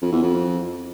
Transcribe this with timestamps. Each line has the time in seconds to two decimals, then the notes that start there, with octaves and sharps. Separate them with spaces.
0.02 F2
0.12 E2
0.22 F2